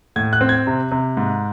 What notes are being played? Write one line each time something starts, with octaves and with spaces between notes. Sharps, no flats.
A2 G#6
F#6
C4
G#6
C3
C3
G#2